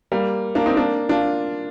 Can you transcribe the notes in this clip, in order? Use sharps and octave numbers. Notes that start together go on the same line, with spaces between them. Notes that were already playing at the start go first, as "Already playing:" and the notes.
G3 A#3
A#3 D4
C4 D#4
A#3 D4
D4 F4